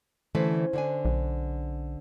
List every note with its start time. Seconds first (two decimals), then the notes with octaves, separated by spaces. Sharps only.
0.35 D3 E3 A3 C#4 C5
0.73 D3 D4 G#5
1.05 B1